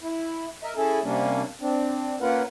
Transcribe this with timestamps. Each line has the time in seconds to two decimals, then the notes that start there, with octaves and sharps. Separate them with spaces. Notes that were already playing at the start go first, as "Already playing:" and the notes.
0.01 E4
0.63 A#4 D#5 E5
0.76 C#4 E4 G#4 A4
1.03 C3 G3 A#3 C#4 D4
1.61 C4 D4
2.21 A#3 C#4 F4 A#4 B4 F#5